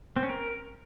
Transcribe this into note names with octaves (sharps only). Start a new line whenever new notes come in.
C4
C#4
A#4